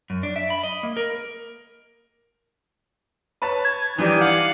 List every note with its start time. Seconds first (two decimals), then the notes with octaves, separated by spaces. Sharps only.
0.10 F#2
0.23 D4
0.36 E5
0.50 B5
0.63 D#5
0.83 A#3
0.97 A#4
3.42 B4 C#5 A5
3.65 G#6
3.98 D#3 E3 G3 G4 G#5
4.21 D5 F5 F#5